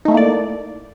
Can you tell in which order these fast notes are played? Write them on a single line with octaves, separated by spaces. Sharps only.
D#4 A3 E4 A#3 D5